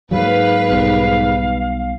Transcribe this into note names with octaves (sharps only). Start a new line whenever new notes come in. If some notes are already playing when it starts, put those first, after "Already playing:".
G#2 F#3 A#3 B4 F5
B1 G3